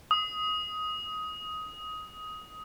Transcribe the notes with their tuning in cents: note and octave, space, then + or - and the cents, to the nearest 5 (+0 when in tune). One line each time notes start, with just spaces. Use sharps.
D#6 +15